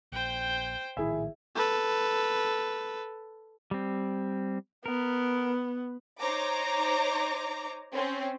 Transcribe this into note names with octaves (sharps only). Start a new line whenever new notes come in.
A#1 C5 G5
A#1 A2 D#3 E4 G#4 E5
A4 B4
G3 C4
B3 A#4
D#4 C5 C#5 A#5 D6
C4 C#4